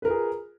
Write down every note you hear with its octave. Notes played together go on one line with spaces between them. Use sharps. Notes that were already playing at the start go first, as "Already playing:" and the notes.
F4 G#4 A#4 B4